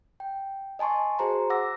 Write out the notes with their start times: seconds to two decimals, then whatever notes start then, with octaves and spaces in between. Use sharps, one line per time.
0.20 G5
0.79 D#5 G#5 A5 C6 C#6
1.19 F#4 G#4 C5 A#5 C6
1.50 F#5 D6 E6 A#6